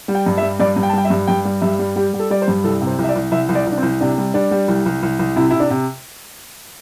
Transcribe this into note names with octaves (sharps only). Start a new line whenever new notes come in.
G3
G5
G2
E5
G3
G2 D5
G2
G5
A5
G3 G5
E5
G2
G2 G5
G3
G2 E5
G3
G3 G4
G3
A4
G3 D5
C5
G2
C2 A4
C3
C5
C2
E5
D5
C2
C2 E5
C2
D5
C2 D4
C4
C2
C3 D4
G3
G3 D4
G3
C2
C2
C2
C2
C3 E4
C3 E4
D4
C3